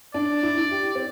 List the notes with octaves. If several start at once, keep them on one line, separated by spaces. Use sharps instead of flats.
D4 D5
E4
E4
G4
C4